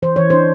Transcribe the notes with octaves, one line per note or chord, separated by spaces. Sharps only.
E3 C5
E3 C#5
D4 C5